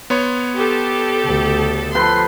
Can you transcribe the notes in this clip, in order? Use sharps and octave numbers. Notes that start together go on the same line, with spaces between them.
B3 C#5 C6
G4 A4
D2 C#3
F3 A4 B4 G5 C6